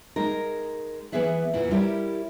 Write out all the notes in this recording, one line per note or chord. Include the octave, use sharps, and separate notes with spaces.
G#3 D#4 A#4
E3 A3 B3 G#4 E5 F#5
E2 A#2 E3 F#5
G3 E4 G4 A#4 C5 C#5